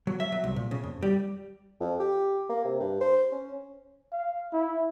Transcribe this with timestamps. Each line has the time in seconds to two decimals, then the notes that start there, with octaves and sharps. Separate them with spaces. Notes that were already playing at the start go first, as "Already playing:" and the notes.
0.07 F#3
0.20 E5
0.32 F#3
0.44 C2
0.56 A#2
0.71 C#3
0.84 F2
1.03 G3
1.81 F2
2.00 G4
2.50 A#3
2.65 C3
2.80 G2
3.01 C5
3.32 C#4
4.12 F5
4.53 E4